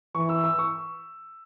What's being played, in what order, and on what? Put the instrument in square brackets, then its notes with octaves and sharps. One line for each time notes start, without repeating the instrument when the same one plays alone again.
[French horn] E3 [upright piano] C#6
[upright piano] E6
E6
C#6